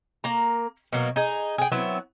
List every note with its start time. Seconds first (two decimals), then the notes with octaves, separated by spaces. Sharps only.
0.24 A#3 A#5
0.93 B2 F#3 A#3
1.16 D#4 G#4
1.58 G#4 G5
1.72 F#3 B3 C4 E4